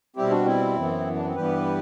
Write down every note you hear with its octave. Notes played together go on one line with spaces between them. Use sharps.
B2 G3 C4 E4 G4
D4 F#4
C4 E4
F#2 E3 B3
D4
C4
G2 E3 G3 B3 G4 B4